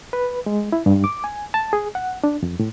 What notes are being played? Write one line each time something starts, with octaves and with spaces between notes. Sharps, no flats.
B4
G#3
E4
G2
D6
G#5
A5
G#4
F#5
D4
F2
A2